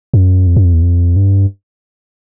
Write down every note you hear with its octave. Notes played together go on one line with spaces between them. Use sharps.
F#2
F2
F#2
F2
E2
F2
G2